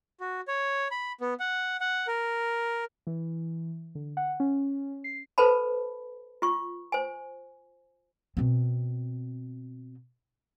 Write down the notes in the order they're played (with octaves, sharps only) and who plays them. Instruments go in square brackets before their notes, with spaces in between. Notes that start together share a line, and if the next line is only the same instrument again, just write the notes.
[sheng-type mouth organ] F#4
C#5
B5
B3
F#5
F#5
A#4
[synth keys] E3
D3
F#5
C#4
C7
[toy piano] A4 B4 C5 A5 B5
F4 C#6
C5 G#5
[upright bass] B2 C4